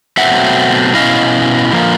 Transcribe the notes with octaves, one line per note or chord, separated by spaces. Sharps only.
B2 F#3 A3 C4 E5 F#5
B2 G#3 C#4 E4 D#5 F5
D3 F3 A#3